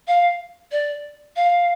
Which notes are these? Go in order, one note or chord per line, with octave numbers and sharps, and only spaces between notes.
F5
D5
F5